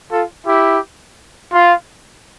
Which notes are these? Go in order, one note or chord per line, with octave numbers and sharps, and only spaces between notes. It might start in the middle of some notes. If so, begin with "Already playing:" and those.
F4 A4
E4 G4
F4